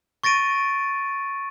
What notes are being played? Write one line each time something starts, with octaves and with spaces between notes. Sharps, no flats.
C#6 A6 A#6 D7 D#7